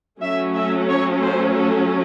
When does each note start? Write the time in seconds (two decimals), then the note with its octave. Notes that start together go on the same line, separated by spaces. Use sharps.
0.22 F#3 A3 C#4 E5
0.54 E5
0.88 C#5
1.22 C5
1.55 A4